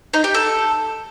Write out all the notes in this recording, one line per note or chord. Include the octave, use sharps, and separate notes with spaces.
D#4
G4
A4